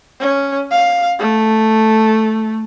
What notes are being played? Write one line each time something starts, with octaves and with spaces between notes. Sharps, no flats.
C#4
F5
A3